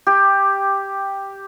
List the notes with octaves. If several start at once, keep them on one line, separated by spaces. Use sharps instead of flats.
G4